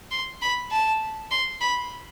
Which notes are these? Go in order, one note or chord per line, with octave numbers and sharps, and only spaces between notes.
C6
B5
A5
C6
B5